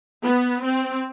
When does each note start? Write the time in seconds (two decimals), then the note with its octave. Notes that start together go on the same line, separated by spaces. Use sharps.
0.23 B3
0.63 C4